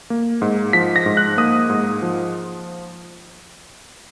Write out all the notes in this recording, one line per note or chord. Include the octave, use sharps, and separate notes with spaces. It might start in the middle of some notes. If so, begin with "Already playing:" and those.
A#3
G#2
F3 B6
A#6
G#2
F#6
A#3 D#6
G#2
F3